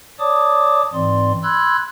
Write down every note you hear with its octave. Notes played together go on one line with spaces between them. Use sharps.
C#5 D5 A5 D6 D#6
G#2 E3 C4 D5 C6
B5 C6 E6 F#6 G#6